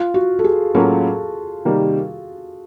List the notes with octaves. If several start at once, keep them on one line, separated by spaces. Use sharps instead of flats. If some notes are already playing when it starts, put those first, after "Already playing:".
Already playing: F4
F#4
A4
G#4
A2 F#3 A#3 C#4 F4 A4
C3 D#3 G3 A#3